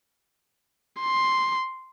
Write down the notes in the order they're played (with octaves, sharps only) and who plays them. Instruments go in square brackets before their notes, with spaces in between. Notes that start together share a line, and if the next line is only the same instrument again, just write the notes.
[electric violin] C6